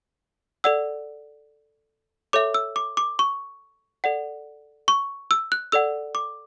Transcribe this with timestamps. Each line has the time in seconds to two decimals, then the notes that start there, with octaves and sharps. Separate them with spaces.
0.64 A4 D5 F#5 E6
2.33 A4 C#5 E5 D6
2.54 E6
2.76 D6
2.97 D6
3.19 C#6
4.04 A4 D5 F#5
4.88 C#6
5.31 E6
5.52 F#6
5.72 A4 D5 F#5 E6
6.15 D6